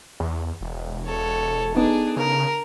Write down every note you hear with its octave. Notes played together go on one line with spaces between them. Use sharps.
E2
E1
A4 C#5
B3 D4 D#4 G#4
C#3 A#4